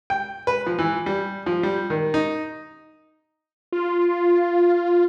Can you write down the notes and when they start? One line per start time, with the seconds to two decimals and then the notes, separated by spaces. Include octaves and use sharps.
0.10 G5
0.47 B4
0.66 F3
0.79 E3
1.06 G3
1.46 F3
1.63 G3
1.90 D#3
2.14 D#4
3.72 F4